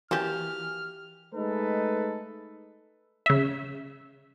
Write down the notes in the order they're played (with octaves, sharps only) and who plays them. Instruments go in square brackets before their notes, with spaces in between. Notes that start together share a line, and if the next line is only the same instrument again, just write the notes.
[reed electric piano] E3 [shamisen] F#3 A#3 C#4 [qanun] G4 A5 [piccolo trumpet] F6
[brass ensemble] G#3 A3 D#4 A4 B4
[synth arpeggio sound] C#3 E5